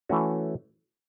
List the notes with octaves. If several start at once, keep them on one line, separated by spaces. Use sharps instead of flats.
E3 A3 C#4 F#4